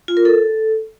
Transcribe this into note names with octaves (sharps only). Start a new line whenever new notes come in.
F4
A#4
A4